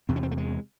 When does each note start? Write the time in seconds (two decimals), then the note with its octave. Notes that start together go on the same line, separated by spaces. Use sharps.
0.09 E2 C3 C4
0.16 C#4
0.23 C4
0.31 A3
0.38 G#3